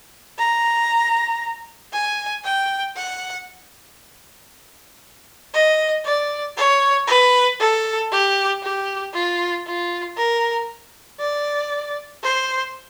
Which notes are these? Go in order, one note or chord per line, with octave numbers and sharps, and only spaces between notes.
A#5
G#5
G5
F#5
D#5
D5
C#5
B4
A4
G4
G4
F4
F4
A#4
D5
C5